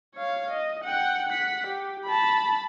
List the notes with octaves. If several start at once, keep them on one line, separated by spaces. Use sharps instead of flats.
C#5 F5
D#5
F#5 G5
F#5 B6
G4
A5 B5